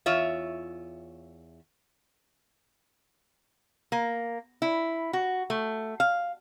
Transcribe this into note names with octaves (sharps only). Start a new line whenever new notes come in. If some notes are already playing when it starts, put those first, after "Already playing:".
E2 F4 C#5 E5
A#3
E4
F#4
A3
F5